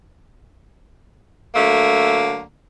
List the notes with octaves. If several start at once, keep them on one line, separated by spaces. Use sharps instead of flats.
D3 F#3 A3 A#3